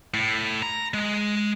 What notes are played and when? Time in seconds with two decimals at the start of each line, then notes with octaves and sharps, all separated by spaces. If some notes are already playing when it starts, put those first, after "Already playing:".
0.14 A2
0.62 A#5
0.94 G#3